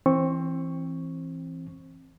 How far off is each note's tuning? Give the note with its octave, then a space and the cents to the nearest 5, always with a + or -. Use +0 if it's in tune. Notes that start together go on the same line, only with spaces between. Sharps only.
E3 +5 C4 +20 C#6 +0